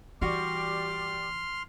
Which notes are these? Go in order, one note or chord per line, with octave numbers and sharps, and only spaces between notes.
E3 G3 F#4 G4 D5 C6 D6 F6